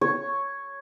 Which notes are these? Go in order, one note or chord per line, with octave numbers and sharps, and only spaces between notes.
C#5